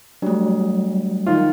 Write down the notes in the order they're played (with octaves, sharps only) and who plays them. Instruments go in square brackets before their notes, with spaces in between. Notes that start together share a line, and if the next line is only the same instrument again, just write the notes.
[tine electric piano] F#3 G3 [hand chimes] A3 D4
[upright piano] D#3 F4